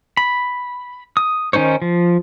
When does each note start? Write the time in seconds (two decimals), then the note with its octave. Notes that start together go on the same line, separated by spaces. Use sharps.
0.17 B5
1.17 D#6
1.53 D#3 C#4 D#4 C5 C#5
1.82 F3